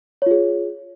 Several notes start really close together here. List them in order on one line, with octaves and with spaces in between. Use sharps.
C#5 F4 G#4